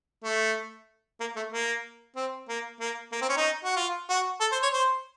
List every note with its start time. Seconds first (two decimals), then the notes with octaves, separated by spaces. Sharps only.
0.24 A3
1.20 A#3
1.36 A3
1.52 A#3
2.16 C4
2.49 A#3
2.81 A#3
3.13 A#3
3.21 C4
3.29 C#4
3.37 D#4
3.65 F#4
3.77 F4
4.10 F#4
4.41 A4
4.52 C5
4.63 C#5
4.73 C5